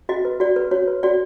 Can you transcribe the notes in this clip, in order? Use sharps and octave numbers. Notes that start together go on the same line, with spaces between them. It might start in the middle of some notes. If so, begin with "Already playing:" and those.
F#4 D#5
B4
F#4 D5
B4
F#4 C#5
B4
F#4 D5